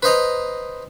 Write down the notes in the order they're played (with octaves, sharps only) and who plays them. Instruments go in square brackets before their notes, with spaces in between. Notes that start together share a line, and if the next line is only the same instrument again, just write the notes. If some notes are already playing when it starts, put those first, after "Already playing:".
[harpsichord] B4 C5 D#5 A#5